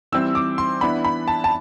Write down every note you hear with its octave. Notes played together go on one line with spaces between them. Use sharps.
E3 G3 C4 E6
D6
C6
E3 B3 D4 B5
B5
A5
A5